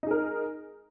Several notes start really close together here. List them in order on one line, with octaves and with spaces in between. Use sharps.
D#4 G#4 A#4